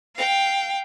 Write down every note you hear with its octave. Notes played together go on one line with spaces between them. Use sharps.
F5 G5